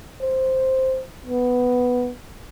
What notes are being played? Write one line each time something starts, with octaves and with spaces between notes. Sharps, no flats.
C5
B3